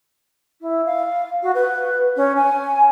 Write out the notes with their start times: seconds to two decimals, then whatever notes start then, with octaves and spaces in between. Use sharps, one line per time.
0.61 E4
0.86 F5
1.42 F#4
1.55 B4
2.16 C#4
2.36 G#5